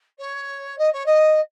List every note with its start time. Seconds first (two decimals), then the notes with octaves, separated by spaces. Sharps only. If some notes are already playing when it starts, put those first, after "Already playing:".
0.18 C#5
0.78 D#5
0.92 C#5
1.05 D#5